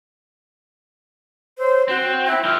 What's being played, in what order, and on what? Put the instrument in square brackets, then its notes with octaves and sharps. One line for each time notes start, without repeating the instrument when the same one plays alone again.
[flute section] C5 C#5 E6
[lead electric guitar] C4 [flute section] F#4
[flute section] E4 G5 F#6
[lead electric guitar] E3 G4 [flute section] F4 E6 F6